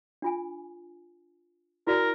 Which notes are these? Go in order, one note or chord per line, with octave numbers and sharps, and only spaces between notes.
D4 F4 G#5
E4 F#4 A#4 D5